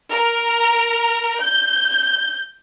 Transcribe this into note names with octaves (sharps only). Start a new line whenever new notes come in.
A#4
G6